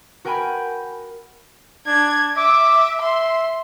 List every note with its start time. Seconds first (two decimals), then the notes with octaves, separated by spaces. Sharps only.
0.25 F#4 A#4 G5 G#5 B5
1.87 D4 G#6
2.37 E5 D6
3.01 E5 C6